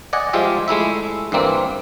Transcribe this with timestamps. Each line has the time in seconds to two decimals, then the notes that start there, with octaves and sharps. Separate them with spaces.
0.13 D5 D#5 F#5 G#5
0.33 F3 G3 G#3 F4 G4 E5
0.68 G#3 A3 E4 E5
1.32 G2 E3 G3 A#3 C4